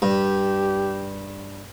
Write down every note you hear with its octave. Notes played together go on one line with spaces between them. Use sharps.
G2 G4